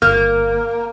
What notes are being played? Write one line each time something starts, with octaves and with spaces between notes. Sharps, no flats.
G1 A#3 F6